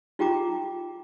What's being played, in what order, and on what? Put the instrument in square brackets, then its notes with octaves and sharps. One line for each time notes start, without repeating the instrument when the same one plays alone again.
[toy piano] D#4 F4 G4 G5 A#5 D6